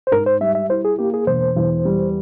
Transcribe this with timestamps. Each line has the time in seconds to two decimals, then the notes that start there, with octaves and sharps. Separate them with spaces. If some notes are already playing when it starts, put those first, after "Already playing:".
0.07 C5
0.11 G#2 A#4
0.26 C5
0.40 G3 E5
0.55 E5
0.69 E4 C5
0.85 G#4
0.99 A#3 G4
1.14 G#4
1.27 E1 C5
1.56 E2
1.85 G3